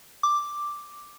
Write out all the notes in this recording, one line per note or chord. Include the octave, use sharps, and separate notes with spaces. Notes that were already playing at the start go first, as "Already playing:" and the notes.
D6